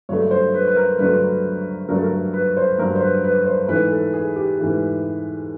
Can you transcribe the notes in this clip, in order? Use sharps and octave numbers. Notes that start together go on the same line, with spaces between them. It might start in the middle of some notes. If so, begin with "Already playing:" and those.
G2 D3 F#3 A3 C#5
C5
B4
B4
A#4
G2 D3 F#3 A3 B4
G2 D3 F#3 A3 A#4
A4
A#4
B4
C5
G2 D3 F#3 A3 A#4
C5
B4
B4
C5
G#2 E3 A3 B4
A4
G#4
G4
G#2 E3 A3